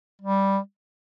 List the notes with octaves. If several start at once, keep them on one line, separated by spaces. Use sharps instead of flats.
G3